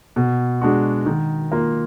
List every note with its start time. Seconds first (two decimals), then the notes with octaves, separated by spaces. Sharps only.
0.16 B2
0.61 G#3 D4 F#4
1.06 D#3
1.52 A#3 F4